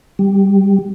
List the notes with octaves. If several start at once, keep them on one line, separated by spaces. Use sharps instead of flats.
G3